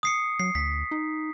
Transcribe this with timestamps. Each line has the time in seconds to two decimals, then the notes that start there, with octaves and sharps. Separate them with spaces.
0.03 D#6 C7 C#7
0.40 F#3 C7
0.55 D2 B6
0.91 D#4